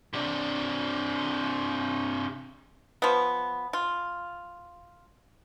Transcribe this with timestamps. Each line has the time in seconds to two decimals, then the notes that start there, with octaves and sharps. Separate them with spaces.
0.13 C3 D4
3.02 F3 B3
3.73 F4